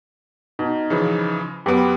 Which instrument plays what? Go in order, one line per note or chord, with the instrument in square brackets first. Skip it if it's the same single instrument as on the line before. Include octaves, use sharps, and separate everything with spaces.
[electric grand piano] B2 [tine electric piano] D#4
[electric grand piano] C#3 E3 F3
[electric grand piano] F#2 B3 [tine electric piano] G4 B4 D6